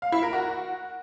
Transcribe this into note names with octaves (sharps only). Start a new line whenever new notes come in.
F5
E4
A#4
F#4